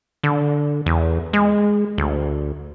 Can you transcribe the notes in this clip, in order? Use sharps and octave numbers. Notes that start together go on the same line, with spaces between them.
D3
E2
G#3
D2